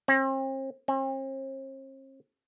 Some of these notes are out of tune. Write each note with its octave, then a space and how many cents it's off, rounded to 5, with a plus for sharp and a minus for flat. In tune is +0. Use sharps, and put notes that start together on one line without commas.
C4 +40
C4 +45